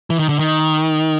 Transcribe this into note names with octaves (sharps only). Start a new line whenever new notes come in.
E3
D#3
D3
D#3